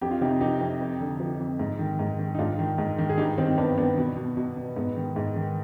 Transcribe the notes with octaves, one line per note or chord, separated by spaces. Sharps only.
F2 G4
F4
C3 D#4 G4
F3 D#4 G4
F2
F2
D3
F3
F2
G#2
D#3
G#2
D#3
D#4
G#2 D4 F4
D#3
G#2
D#3
G#4
G2 D#4 G4
D#3 C4 D#4
G2 B3 D4
D#3 B3 D4
B2
B2
B2
B2
G#2 B3
D#3
G#2
D#3